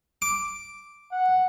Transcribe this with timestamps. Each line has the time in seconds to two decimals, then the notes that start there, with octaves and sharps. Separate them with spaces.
0.22 D6
1.12 F#5